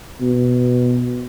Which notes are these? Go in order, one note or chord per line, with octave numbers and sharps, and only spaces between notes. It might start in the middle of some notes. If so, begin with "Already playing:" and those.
B2